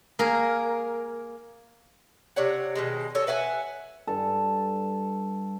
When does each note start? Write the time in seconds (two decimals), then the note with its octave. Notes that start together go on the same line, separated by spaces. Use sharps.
0.19 A#3 G#4 A#4
2.36 C3 D4 C#5 F#5
2.75 B2 D#3 G#3
3.15 A4 C#5 D#5
3.27 B4 E5 F#5 G#5
4.07 G2 A4